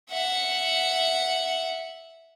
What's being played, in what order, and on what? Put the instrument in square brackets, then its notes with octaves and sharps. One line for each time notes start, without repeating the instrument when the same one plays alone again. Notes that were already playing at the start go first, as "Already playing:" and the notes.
[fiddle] E5 F#5